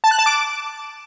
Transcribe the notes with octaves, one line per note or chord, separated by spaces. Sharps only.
A5
F#6
A5
D6